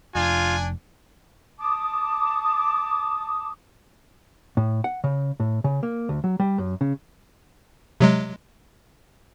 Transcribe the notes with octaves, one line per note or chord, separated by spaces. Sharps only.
F1 D4 F4 G#5
A5 D6 D#6
A2
F#5
C#3
A2
C#3
A#3
D2
F#3
G3
F#2
C#3
C3 F#3 G#3